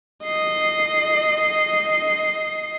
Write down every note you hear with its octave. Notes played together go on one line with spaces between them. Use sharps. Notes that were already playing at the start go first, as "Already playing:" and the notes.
D#5 C7